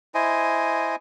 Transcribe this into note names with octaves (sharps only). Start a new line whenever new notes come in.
E4 C5 D#5 G#5